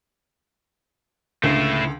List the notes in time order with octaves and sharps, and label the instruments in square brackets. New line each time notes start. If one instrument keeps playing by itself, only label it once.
[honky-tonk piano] C#2 D3 [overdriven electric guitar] A3 E4